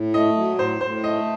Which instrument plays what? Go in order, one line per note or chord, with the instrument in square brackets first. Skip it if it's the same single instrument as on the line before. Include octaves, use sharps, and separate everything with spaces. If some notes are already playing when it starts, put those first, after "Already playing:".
Already playing: [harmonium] A2
[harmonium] A3 [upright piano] D#5
[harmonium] F#3
[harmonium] A2 [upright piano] C5
[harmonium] A2 [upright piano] C5
[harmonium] A3 [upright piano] D#5